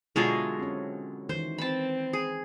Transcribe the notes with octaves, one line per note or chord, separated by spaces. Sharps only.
B2 D3 F#3 G#3 E4 F4 G#4 A#4
C4 C#4
D#3 E3 C5
C4 A5 B5
G#4